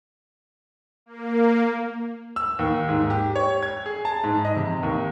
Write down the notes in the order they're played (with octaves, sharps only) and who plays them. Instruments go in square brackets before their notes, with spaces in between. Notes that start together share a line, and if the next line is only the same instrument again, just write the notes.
[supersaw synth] A#3
[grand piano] E6
D#2
G#2
G4
C#5
G#6
G#4
A5
G#2
D#5
C3
D#2